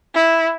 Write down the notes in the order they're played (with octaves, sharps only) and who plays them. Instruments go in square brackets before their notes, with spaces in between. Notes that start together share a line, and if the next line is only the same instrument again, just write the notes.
[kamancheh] E4